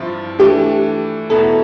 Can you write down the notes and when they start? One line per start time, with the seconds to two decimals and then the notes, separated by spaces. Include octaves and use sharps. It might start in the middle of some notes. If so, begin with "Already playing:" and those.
Already playing: G2 F3 C4 E4 F4
0.39 E3 A3 D4 G4
1.30 E2 B2 B3 E4 A4